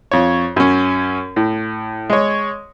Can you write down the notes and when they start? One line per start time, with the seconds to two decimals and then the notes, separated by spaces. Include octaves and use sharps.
0.11 F2 C#5
0.56 F#2 C#4
1.36 A2
2.10 G#3 C#5